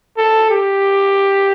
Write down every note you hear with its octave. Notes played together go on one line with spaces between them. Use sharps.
A4
G4